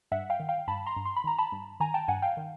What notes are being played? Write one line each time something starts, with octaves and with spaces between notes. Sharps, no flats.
G2 E5 F#5
F5 G5
D#3
F5 G5
G2 A5 B5
A#5 C6
G2
C6
B5
D#3 A#5
A5 B5
G2
D#3 G#5 A#5
G5 A5
G2 F#5 G#5
F5 G5
D#3